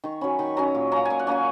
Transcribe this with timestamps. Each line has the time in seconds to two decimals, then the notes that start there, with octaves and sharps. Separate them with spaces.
0.04 D#3 C#6
0.21 F#3 C#4 B5
0.39 D#3 C#6
0.57 F#3 C#4 A#5
0.75 A#2
0.92 A#3 C#4 A#5
1.05 A#2 G#5
1.19 F#5
1.27 A#3 C#4 G#5